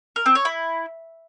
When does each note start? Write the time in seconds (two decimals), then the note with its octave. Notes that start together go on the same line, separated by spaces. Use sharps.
0.16 A#4
0.26 C4
0.35 C#5
0.45 E4